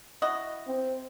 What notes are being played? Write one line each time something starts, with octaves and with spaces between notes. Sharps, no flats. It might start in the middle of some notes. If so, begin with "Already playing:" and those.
E4 F#4 D#5
C4